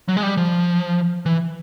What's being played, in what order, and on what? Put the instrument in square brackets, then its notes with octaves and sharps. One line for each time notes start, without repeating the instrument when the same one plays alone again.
[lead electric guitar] F#3
G#3
G3
F3
E3